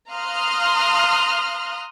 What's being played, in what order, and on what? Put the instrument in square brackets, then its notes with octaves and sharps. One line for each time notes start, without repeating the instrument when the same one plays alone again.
[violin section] F5 A#5 C6 D#6 F6 F#6